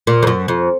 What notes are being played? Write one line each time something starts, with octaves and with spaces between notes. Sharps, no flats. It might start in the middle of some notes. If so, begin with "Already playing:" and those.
A#2
F2
F#2
F2